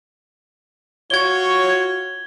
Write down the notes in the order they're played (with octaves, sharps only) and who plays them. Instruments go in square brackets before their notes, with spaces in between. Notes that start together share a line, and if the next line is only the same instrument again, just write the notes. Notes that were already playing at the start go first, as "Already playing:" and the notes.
[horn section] F4 F#4 C#5 [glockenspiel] G#6 G7